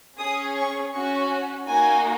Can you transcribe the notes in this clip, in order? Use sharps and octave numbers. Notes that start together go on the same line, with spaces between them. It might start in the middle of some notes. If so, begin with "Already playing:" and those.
C#4 G#4 D#6
C#6
C#4 F#4 C#6
A#3 D#4 F#4 G#5